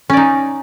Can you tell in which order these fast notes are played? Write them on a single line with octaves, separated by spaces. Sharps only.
C#4 D5 D#4